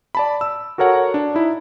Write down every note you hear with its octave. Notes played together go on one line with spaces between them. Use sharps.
D5 A5 B5
E6
F#4 A4 A#4 C#5 F#5
D4
D#4 E4